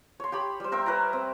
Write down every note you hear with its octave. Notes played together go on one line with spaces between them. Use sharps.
C#5 C6
G4 C#5 B5
G3 C5
A#4 C5 E5 G5
A#4 B4 C#5 A#5
C4